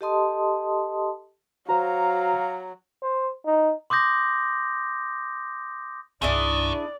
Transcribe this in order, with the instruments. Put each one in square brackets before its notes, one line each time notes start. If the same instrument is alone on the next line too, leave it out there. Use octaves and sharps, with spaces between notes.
[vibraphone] G4 A4 D#5 A5 C6 D#6
[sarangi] F#3 [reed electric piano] F#4 C5 [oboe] F5 [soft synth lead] A#5
[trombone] C5
D#4
[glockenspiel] C6 D6 D#6 G6 A#6
[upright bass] C2 G2 [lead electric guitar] D#3 [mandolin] D4 E4 G#4 [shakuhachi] D5